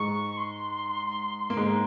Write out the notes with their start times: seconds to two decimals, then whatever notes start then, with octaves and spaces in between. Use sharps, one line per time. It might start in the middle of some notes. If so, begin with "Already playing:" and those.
Already playing: G#2 G#3 C#6
0.37 C6
1.50 A#3
1.57 G#2 G#3